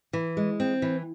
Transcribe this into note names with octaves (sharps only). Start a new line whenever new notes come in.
E3
G#3
C4
E3